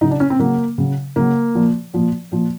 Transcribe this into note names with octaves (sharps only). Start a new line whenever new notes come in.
C#3 F#3 D#4
D4
C#4
C4
C#3 F#3 A#3
C#3 F#3
C#3 F#3 A#3
A#2 F3
A#2 F3
A#2 F3